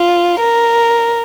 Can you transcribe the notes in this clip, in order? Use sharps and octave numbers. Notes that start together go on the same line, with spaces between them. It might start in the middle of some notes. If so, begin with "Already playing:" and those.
Already playing: F4
A#4